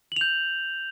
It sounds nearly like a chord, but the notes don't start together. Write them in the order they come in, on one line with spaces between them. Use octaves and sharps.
F#7 F7 G6